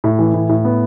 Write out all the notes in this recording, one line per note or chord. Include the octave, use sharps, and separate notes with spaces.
A2
E3
A2
A2
B3